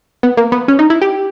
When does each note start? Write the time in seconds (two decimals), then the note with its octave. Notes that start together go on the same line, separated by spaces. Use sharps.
0.23 B3
0.37 A#3
0.52 B3
0.68 C#4
0.79 D#4
0.90 E4
1.01 G4